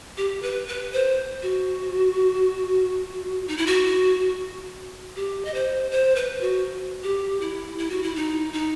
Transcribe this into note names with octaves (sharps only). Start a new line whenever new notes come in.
G4
B4
B4
C5
F#4
D#4
E4
F#4
G4
D#5
C5
C5
B4
F#4
G4
E4
E4
F#4
E4
D#4
D#4